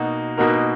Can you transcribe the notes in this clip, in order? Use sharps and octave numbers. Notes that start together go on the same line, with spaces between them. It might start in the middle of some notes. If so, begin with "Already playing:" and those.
Already playing: B2 A#3 D#4 F#4
B2 A#3 D#4 F#4 A#4